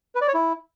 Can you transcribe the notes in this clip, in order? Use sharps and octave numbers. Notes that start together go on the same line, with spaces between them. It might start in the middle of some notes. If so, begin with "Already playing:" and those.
B4
D5
C#5
E4